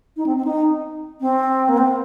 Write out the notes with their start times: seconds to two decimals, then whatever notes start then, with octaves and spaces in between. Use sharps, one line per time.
0.17 D#4
0.26 C4
0.37 C4
0.45 D#4
1.21 C4
1.69 A#3
1.78 C4